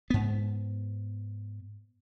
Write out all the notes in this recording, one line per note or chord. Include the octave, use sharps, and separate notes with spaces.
G#2 B3